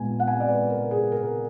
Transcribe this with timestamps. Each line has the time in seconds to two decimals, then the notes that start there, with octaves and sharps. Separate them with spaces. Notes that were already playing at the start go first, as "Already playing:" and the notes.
Already playing: A#2 G#3 B3 G#5
0.20 F#5
0.28 G#5
0.40 D5
0.49 B4
0.69 A#4
0.91 G#4
1.12 A#4